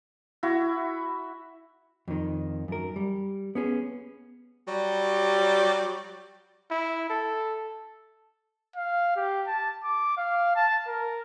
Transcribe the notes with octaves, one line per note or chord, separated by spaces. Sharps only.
E4 F#4
F2 D#3
F#2 A#4
G3
B3 C#4 G#4
F#3 G3
E4
A4
F5
G4
A5
D6
F5
A5
A#4